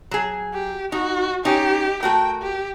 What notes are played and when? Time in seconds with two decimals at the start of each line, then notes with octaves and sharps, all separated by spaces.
0.11 F#3 G#4
0.53 G4
0.92 D#4 F#4
1.45 C#4 D#4 G4
2.03 A3 F#4 A#4 G5
2.42 G4